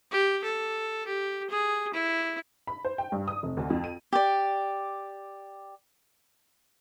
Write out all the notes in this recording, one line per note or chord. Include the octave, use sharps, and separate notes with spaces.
G4
A4
G4
G#4
E4
B5
C5
G5
G2
D#6
F1
D2
F2
D#7
G4 D5